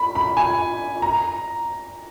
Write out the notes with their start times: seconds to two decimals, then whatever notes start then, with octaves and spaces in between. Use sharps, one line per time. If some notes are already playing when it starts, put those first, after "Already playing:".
Already playing: B5
0.15 B5
0.37 G#5
1.02 A#5